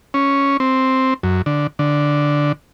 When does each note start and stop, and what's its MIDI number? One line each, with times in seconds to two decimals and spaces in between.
0.14 0.57 61
0.60 1.14 60
1.23 1.42 42
1.46 1.67 50
1.79 2.52 50